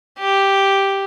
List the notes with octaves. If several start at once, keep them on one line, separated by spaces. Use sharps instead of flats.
G4